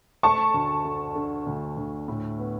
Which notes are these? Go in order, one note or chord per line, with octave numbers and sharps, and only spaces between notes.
A3 A5 C#6
D2
D3
D3
D2
D2
A2
B3